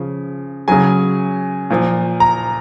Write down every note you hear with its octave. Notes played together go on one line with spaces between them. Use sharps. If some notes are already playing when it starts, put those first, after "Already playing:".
Already playing: C#3 F3
C#3 F#3 G#5
A#2 F3
A#5